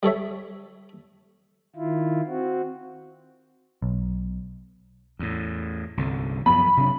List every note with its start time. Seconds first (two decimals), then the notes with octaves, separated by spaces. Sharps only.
0.03 G3 A4 C#5 E5
1.76 D#3 E4 F4
2.27 C4 F#4
3.82 B1
5.19 E2 A2
5.97 C2 G2 D3
6.46 F#2 F3 B3 B5
6.77 C3 F#3 D4